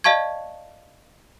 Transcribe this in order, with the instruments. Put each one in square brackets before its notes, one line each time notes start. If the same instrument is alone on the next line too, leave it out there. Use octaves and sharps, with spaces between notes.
[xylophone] D5 D#5 F5 A5 C#6 G#6